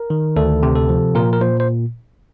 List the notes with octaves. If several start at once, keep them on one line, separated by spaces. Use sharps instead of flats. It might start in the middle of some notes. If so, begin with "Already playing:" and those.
Already playing: A#4
D#3
D2 A4
C3
A4
F3
A#2 A#4
A#4
A#2 C5
C5